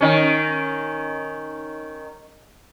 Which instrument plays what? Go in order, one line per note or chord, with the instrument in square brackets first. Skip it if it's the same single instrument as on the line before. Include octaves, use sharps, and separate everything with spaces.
[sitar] D#3 C#4